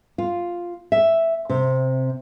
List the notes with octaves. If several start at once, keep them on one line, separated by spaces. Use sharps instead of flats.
F4
E5
C3